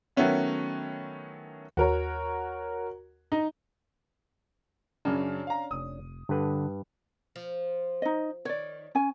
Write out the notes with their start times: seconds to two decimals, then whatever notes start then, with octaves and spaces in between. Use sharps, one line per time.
0.16 D#3 F#3 A3 B3 C#4 E4
1.77 D#2 F#4 A#4 C#5
3.32 D#4
5.05 F#2 C#3 C#4 D4
5.47 F5 A#5
5.71 F1 D#6
6.29 G2 D3 B4
7.36 F3
8.02 D#4 D#5
8.45 D#3 C#5 D5
8.95 C#4 G#5